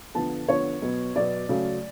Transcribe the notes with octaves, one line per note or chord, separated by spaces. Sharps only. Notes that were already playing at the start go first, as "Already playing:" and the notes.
D3 F3 B3 A5
D3 F3 B3 C#5
B2 F#3 B3
B2 F#3 B3 D5
C#3 F#3 A3